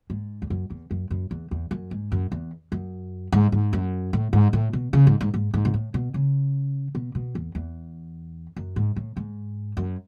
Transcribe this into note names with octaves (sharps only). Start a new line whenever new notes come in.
G#2
E2
F#2
E2
F#2
F#2
E2
E2
F#2
G#2
F#2
E2
F#2
G#2
G#2
F#2
A2
G#2
A2
B2
C#3
G#2
G#2
G#2
G#2
B2
A2
B2
C#3
B2
B2
E2
E2
F#2
G#2
A2
G#2
F#2